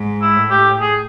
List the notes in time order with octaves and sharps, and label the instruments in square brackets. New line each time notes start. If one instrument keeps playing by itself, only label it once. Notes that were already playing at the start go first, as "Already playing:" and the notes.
Already playing: [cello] G#2
[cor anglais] E4
[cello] A2
[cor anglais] G4
G#4